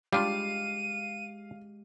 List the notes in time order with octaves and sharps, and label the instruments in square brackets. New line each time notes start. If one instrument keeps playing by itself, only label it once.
[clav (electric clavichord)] G3 D4 F4 [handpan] G#3 G4 [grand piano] F5 [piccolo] D#7